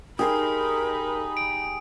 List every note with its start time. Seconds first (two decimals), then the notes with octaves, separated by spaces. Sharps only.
0.19 D#4 G4 G#4 A#4 B5 C6 D#6
1.37 D7